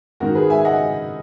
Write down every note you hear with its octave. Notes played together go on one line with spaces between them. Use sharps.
G#2 D#3 F#4 A#4
G#4 B4
E5 G#5
G#5
D#5 F#5